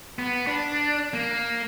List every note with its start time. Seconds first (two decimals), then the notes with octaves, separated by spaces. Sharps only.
0.19 B3
0.47 D4
1.13 A#3